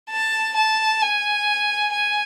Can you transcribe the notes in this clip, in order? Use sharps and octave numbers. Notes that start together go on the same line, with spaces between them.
A5
A5
G#5
G#5